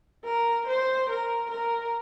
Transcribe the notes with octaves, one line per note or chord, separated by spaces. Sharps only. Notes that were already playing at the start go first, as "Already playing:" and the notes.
A#4
C5
A#4
A#4